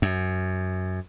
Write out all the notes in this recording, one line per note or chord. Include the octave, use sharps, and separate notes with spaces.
F#2